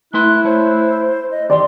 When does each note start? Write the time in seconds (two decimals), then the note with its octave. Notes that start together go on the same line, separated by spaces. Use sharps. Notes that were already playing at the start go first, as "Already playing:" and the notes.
0.14 A3 E4 B4 C6 F#6
0.45 A3 C5 C#5
1.31 D#5
1.50 D#3 E3 G4 D5 C6